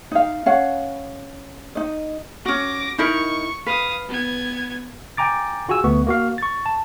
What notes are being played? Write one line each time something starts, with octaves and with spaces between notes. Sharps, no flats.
D#4 F5
C#4 F5 F#5
D#4 D#5
C#4 F#4 D6 A#6
D#4 E4 A#4 C#6
B4 F5 D#6
B3 G#6
G5 G#5 A#5 D6 A6
F4 F#4 G#4 G#5 E6
D2 A3 B3 C#6
A#3 F#4 F5
C#6 A6
A5